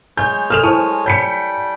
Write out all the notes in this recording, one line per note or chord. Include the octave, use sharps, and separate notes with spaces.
G#3 C#5 G#5 G6
A4 A#4 F6 E7 F7
E4 C5 G#5 A5 C#6 D#7
G3 C#5 G5 B5 G6 B6 C#7